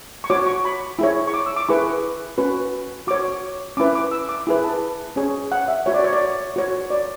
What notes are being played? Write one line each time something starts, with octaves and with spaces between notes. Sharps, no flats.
C#6
F#4 C#5 D6
C#6
B5
E4 G#4 C#5
C#6
D6
E6
D6
E4 G#4 B4 C#6
C#4 F#4 B4
F#4 C#5 D6
C#4 E4 B4 D6
D6
E6
D6
E4 G#4 B4
A5
C#4 G#4 C#5
F#5
E5
F#4 C#5 E5
D5
C#5
D5
F#4 C#5
D5